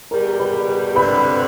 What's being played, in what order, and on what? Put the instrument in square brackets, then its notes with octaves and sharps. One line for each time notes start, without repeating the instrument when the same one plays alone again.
[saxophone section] E2 B2 G3 [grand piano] A#4 A#5
[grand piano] B4 B5
[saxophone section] G2 D3 G3 C4 [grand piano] B4 B5